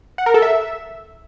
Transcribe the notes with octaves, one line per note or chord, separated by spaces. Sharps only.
F#5
A#4
A4
E5